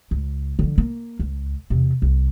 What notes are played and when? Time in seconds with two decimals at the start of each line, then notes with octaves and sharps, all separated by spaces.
0.11 C#2
0.59 D3 F3
0.78 A#3
1.19 C#2
1.70 E2 C3
2.02 C2